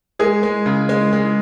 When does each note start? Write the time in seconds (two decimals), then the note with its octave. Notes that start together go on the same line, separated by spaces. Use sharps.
0.19 G#3 G#4
0.43 G#3
0.66 C#3
0.89 G#3
1.13 G#3